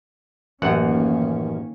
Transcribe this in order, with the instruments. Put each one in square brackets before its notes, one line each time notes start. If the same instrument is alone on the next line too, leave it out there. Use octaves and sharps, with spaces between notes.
[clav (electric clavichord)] A1 F#2 F#5 [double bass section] D#3 A#3 C#4